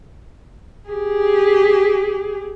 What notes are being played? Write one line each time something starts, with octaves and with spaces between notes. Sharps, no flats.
G4 G#4